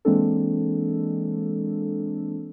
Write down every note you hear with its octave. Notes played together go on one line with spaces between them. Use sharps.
E3 G#3 A#3 C4 D4 A4